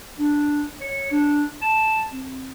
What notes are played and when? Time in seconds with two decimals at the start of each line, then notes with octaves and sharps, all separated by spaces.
0.19 D4
0.81 C#5
1.11 D4
1.62 A5
2.11 C4